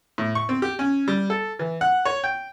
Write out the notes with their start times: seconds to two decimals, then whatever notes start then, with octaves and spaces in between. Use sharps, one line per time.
0.18 A2
0.35 C#6
0.49 C4
0.62 G4
0.79 C#4
1.08 G3
1.30 A4
1.59 E3
1.81 F#5
2.05 C#5
2.24 G5